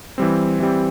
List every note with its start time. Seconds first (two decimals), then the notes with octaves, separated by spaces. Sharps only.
0.18 E3 G3 C4
0.60 E3 G3 C4